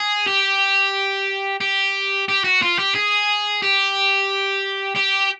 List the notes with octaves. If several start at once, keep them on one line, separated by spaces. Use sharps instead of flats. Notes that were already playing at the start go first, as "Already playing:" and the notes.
Already playing: G#4
G4
G4
G4
F#4
F4
G4
G#4
G4
G4